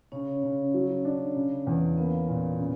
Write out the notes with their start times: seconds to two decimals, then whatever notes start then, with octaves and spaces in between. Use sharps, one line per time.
0.12 C#3 C#4 C#5
0.43 C#3
0.74 F#3
1.05 D4
1.36 C#3
1.67 E2
1.97 A#3 B3 B4
2.28 A#2
2.60 C#3